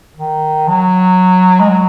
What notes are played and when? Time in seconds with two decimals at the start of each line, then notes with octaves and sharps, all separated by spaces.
0.17 D#3
0.68 F#3
1.60 G#3
1.69 F#3